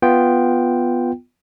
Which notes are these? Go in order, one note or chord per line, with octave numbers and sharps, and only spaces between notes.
B3 F4 G5